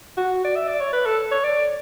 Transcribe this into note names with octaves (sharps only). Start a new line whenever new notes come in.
F#4
D5
E5
D5
C#5
B4
A4
C#5
D5